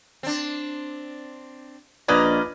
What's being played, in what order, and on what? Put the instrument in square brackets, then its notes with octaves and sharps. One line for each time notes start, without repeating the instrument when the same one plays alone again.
[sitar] C4 D4
[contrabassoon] A#1 [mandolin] A#3 C#4 D#5 [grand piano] B4 D5